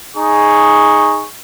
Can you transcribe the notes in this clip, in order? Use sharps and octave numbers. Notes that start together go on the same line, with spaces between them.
D#4 G#4 C#6